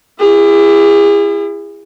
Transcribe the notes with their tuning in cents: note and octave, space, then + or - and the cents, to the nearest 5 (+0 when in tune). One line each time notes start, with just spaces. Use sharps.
E4 +25 G#4 -35